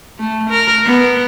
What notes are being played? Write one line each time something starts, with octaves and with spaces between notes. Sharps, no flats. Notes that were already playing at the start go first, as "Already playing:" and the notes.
A3
A#4
B3